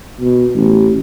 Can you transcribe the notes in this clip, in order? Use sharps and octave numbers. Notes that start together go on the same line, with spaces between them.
B2
A1